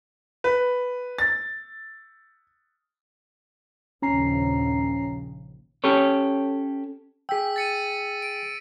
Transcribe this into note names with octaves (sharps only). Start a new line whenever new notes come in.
B4
A6
A#1 D#2 C#3 C#4 A#5 C7
C#4 G4 A4 C#5
G#4 G5 E6 B6
A6 C#7 D#7
D7